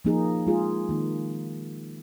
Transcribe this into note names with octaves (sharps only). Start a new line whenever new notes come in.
F3 A#3 D#4 G#4
G#3 F4 G#4
D#3 A#3 D#4